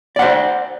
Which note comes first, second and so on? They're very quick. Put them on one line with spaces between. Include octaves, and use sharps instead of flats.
D5 F#5 C5